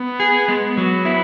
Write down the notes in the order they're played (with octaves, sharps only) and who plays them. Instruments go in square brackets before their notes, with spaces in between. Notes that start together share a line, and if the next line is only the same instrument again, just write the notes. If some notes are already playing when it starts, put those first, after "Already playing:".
Already playing: [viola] B3
[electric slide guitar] G#4
G#3
[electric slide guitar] F#3 [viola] B3
[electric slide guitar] E4